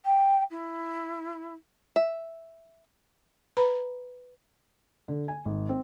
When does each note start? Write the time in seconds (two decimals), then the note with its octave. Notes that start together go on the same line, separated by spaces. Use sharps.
0.05 G5
0.50 E4
1.96 E5
3.57 B4 A#5 B5
5.08 D3
5.28 G#5
5.45 G#1
5.69 C4